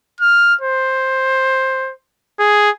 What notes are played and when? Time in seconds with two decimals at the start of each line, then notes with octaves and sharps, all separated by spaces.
0.20 F6
0.61 C5
2.39 G#4